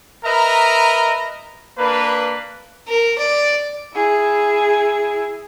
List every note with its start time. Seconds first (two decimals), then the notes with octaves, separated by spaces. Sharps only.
0.25 A#4 B4 D#5 E5 A#5
1.78 A#3 D4 B4
2.88 A#4
3.19 D5
3.94 E4 G#4